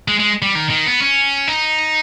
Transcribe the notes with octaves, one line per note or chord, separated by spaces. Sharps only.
G#3
G#3
G3
D#3
D#3
B3
C#4
D#4